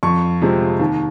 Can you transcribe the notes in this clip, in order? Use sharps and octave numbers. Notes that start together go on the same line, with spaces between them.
F2 C#6
C3 F3 G#3 C4
D#2